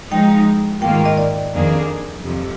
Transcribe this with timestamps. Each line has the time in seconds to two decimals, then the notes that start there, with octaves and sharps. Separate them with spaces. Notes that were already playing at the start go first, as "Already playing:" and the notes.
0.11 F3 G#3 D#4 G5
0.82 G#2 D#3 A#3 F4 G5
0.94 G5
1.05 D#5
1.17 D5
1.53 F2 D#3 A#3 D4 G#4
2.23 F2 C3 F3